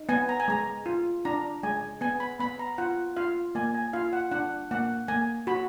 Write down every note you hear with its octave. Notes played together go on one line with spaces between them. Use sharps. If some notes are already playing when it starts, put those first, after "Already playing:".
Already playing: D#4
B3 G#5
A#5
G#5
G#3 A#5
F4
D4 A#5
G#3 G#5
B3 G#5
B5
B3 B5
A#5
F4 F#5
F4 F5
A#3 G#5
G#5
F4 F5
F#5
D4 F#5
A#3 F#5
A#3 G#5
F#4 B5